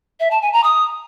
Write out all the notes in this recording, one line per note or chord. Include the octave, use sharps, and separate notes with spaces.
E5
A5
G#5
A#5
D#6